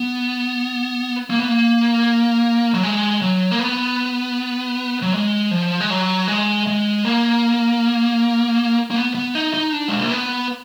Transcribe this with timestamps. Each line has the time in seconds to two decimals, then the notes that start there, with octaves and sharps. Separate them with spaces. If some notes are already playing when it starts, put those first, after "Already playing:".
Already playing: B3
1.30 A#3
1.39 B3
1.48 A#3
2.74 F#3
2.83 G#3
3.22 F#3
3.51 A#3
3.59 B3
5.02 F#3
5.14 G#3
5.51 F3
5.81 G#3
5.90 F#3
6.28 G#3
6.67 G#3
7.05 A#3
8.91 A#3
8.96 B3
9.15 B3
9.35 D#4
9.54 D#4
9.72 D4
9.88 G#3
10.00 A#3
10.11 B3